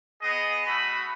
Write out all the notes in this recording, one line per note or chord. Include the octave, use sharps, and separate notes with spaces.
B3 G#4 D#5
A3 F#4 B5